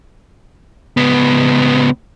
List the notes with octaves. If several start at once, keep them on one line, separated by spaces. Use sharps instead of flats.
C#2 B3